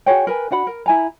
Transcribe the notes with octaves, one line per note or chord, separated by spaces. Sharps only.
F#4 G#4 C#5 G5
A#4 B4 G#5
D4 F#4 F#5 B5
A#4
E4 G#5 A#5